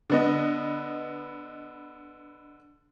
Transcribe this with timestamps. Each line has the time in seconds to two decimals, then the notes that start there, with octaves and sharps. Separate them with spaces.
0.10 D3 B3 D#5